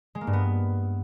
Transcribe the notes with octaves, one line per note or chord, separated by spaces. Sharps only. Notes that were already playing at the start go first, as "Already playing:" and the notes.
G#3
A#3
G2
B3